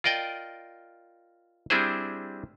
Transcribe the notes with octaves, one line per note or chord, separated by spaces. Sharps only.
F4 A#4 D5 D#5 G5
G3 C4 D4 E4 G#4 C5